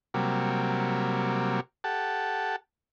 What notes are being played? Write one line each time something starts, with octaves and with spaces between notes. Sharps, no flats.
C3 F#3 G3 A#3
G4 A4 F#5 A5